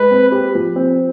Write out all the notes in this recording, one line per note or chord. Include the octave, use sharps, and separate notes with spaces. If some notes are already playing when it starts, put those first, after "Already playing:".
Already playing: G#3 B4
C4
G4
F3
C4